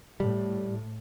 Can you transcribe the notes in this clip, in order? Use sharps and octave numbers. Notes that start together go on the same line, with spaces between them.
A2 G3